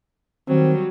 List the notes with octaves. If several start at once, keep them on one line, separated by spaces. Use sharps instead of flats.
D#3 F#3 G3 C4